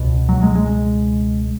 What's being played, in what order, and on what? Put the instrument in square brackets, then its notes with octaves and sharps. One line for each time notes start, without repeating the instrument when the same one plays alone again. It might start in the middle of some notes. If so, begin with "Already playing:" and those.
Already playing: [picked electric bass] C#2 B2
F#3
G#3
G#3